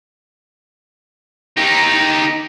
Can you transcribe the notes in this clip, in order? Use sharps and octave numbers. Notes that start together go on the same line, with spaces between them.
D#4 G4